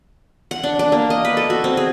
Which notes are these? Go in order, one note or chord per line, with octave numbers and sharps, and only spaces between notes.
F#5
D4
D4
A#3
D#5
B4
A4
F#4
C4
G#4